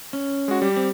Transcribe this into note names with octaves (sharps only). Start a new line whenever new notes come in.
C#4
G#3 F#4
G3 G4
C4